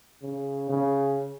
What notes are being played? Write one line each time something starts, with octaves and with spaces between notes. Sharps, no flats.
C#3
C#3